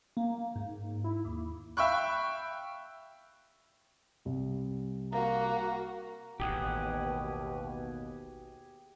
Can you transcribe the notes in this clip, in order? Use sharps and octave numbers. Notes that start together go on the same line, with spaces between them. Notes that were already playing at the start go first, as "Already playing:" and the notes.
A#3
G#2
E4
D#2
E5 F5 G5 B5 C#6 F#6
C2
A#3 F#4 A#5
A1 D#2 B2 G4 G#4 F#5